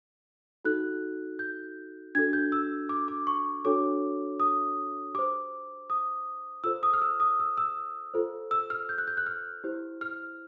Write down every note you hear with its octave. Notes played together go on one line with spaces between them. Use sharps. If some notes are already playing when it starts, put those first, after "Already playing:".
D#4 F#4 A4 F#6
G6
D4 F#4 A4 G#6
G6
E6
D6
D6
C#6
D4 F#4 A4 C#5 D6
D#6
G4 C5 D6
D#6
F4 A4 C5 E6
D#6
F6
E6
D#6
E6
E6
F4 A4 C5
E6
F6
G6
F#6
G6
F#6
F6
E4 G4 C5
F6